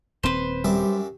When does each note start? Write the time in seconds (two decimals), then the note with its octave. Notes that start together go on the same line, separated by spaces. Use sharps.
0.23 D#1 C4 B4 C5
0.64 F#2 G3 G4 E5